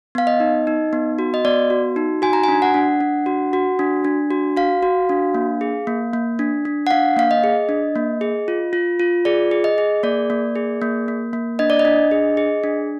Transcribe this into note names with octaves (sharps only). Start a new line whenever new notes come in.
B3 F5
D#5
D#4
D#4
B3
F#4
D#5
B3 D5
F#4
D#4
F#4 G#5
A#5
D4 G#5
F#5
D4
D4
F#4
F#4
D4
D4
F#4
F#4 F5
F#4
D4
A#3
G#4
A#3
A#3
D4
D4
F#5
D4 F5
A#3 F5
D#5
G#4
D4
A#3
G#4
F4
F4
F4
G#4 D5
G#4
D#5
G#4
A#3 D5
A#3
G#4
A#3
A#3
A#3
D4 D#5
D5
D#5
D4
G#4
G#4
D4